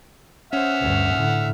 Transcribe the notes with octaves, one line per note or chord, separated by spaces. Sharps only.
C#4 C5 E5 F#5 F6
D2 G2
A2 D3